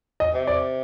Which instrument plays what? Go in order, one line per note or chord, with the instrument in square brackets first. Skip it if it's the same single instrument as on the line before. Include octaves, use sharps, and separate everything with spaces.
[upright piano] D#5
[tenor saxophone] C3
[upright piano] D5